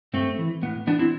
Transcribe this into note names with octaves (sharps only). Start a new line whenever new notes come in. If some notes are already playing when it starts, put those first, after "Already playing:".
G2 A3 C4
E3
A2 B3
E3 B3 D4
C4 E4